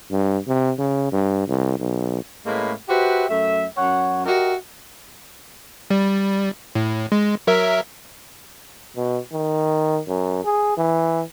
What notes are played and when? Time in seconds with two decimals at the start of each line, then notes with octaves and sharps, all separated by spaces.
0.11 G2
0.47 C3
0.79 C#3
1.12 G2
1.47 C2
1.79 B1
2.46 A2 G#3 A#3 C#4 B4
2.89 F#4 G4 B4 C5 E5
3.29 F#2 A3 E5
3.77 F#2 C#5 F#5
4.25 F#4 G4 A#4 D#5 E5
5.90 G3
6.75 A2
7.12 G#3
7.47 F#3 A#4 E5
8.96 B2
9.32 D#3
10.08 F#2
10.44 G#4
10.77 E3